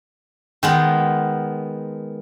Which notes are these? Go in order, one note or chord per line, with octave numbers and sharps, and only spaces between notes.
D#3 G#3 B3